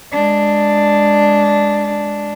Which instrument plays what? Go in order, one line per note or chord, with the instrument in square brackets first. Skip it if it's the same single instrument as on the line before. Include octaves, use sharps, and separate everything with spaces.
[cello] G#3 D4